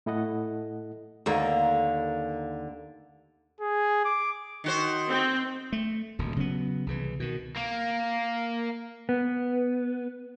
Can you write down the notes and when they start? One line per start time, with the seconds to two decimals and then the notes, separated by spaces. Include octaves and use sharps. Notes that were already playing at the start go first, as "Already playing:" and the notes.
0.06 A2 A3 E4 A4 D#5 F#5
1.26 D#2 D3 A#3
3.61 G#4
4.05 D6
4.64 D#3 F#4 C5
5.10 C4
5.72 A3
6.19 D#1 D2
6.36 C#3 F#3 A3 B3
6.86 C2 C#3 E3
7.20 B2 D#3
7.57 A#3
9.09 B3